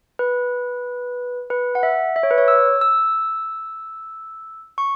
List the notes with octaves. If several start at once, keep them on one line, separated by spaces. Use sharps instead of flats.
B4
B4
F#5
E5
E5
C#5
B4
C#5
E6
E6
C#6